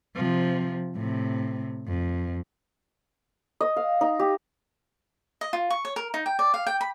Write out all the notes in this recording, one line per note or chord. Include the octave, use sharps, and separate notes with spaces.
C3 F3
A2 C3
F2
D#5
F5
D#4
G4
D#5
F4
C#6
C#5
A#4
D#4
G5
D5
F5
G5
B5